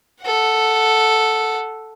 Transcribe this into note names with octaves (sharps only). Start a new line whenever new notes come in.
A4 F#5